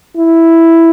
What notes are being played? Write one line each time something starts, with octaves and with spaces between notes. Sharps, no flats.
E4